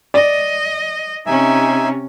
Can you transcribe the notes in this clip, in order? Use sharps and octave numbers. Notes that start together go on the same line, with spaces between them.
D5 D#5
C3 C#4 D#4 E5 G#5